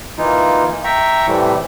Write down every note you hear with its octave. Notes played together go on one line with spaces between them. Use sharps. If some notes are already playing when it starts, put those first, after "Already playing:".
E3 A#3 D#4 F4
E5 G5 A#5 C#6
A2 C3 E3 G3 A3